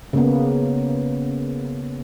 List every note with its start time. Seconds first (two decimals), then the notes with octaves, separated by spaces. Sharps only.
0.13 C#3 A#3 B3